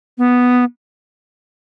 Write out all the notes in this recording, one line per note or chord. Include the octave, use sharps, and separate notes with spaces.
B3